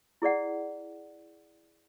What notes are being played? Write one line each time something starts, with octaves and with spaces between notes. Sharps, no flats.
E4 G#4 D5 F#5